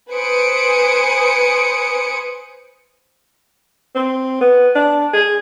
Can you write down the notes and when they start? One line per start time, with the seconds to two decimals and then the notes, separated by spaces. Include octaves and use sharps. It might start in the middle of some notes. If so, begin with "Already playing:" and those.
0.11 B4 C5 G#5 D#6 C#7 D7
3.95 C4
4.41 B3
4.76 D4
5.14 G#4